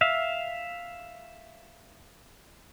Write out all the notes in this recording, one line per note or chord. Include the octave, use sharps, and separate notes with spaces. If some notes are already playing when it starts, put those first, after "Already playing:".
E5 F5